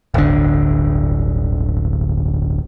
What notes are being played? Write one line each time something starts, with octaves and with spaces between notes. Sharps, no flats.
D1 G1 D3